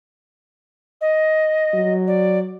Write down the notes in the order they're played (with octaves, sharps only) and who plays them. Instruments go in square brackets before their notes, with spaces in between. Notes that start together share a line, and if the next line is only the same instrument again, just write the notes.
[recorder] D#5
[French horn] F#3
[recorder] D5